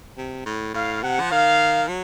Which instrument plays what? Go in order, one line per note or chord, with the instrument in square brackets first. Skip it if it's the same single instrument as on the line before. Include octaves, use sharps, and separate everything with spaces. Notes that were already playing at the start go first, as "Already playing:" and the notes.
[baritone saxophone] C3
A2
[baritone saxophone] A2 [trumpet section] F5
[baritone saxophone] C3 [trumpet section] F#5
[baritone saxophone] F3
[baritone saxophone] D#3 [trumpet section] F5
[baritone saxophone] F#3